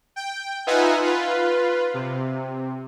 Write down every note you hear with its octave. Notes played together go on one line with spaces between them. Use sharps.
G5
D#4 F4 B4 E5 F#5 G#5
F4 B4
C3